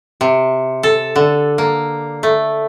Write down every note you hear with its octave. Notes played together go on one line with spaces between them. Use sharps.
C3
A4
D3
A#3
A3